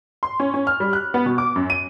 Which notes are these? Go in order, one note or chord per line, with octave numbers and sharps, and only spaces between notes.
C6
C#4
C#4
F6
G3
F#6
B3
B2
D6
F#2
D#7